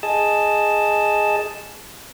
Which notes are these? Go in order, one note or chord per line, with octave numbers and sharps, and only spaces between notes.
G#4 D#5 A5